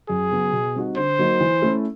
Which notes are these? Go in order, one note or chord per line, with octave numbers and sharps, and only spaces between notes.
F#2 G#4
C#3 F#3 B3
B2
G3 C4 D#4 F#4
D3 C5
F#3 A#3 D#4 F#4
E3
A3 C#4 E4